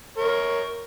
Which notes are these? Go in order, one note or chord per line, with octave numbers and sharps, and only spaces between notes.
A#4 C#5